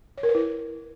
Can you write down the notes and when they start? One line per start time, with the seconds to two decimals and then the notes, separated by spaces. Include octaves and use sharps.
0.18 C#5
0.23 A#4
0.29 B4
0.35 E4